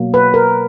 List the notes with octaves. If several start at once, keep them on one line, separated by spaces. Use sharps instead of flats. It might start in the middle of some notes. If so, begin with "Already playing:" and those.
Already playing: B2 F#3 A#3
B4
A#4